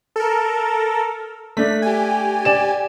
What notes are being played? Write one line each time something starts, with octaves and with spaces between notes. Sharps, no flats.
A4 A#4
A3 D4 B6
G4 G#5
D5 E7